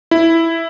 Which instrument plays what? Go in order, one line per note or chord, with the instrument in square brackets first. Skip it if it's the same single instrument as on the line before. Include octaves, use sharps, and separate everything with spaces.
[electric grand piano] E4